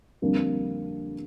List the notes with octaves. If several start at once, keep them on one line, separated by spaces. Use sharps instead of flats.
F2 D3 G3 A#3 D4